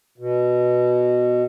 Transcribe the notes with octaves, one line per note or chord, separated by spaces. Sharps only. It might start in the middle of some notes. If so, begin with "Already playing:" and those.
B2